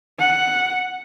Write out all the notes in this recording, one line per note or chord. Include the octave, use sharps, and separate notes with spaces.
F#5